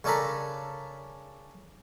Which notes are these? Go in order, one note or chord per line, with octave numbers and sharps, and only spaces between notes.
C#3 C#4 D4 A4 A#4 B5